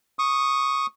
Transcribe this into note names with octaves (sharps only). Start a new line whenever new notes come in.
C#6 D#6